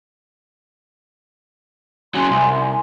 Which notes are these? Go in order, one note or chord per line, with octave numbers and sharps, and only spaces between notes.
C#3 F#3 G#5 C6
C2